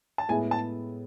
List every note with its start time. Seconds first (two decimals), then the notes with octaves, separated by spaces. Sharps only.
0.18 A5
0.29 A2 G#3 B3 E4 G#4 G#5
0.51 A5